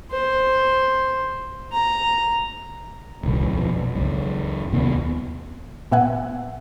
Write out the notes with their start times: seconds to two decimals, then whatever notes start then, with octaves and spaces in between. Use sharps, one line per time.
0.11 C5
1.72 A#5
3.23 D#1 C2
3.47 B1 F2
3.68 B1
3.95 C#2 F#2
4.72 D#2 C3 B3
5.92 A#2 B3 E5 F#5 G#5